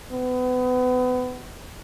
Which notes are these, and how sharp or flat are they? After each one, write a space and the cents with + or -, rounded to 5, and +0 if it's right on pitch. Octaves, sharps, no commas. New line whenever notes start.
B3 +30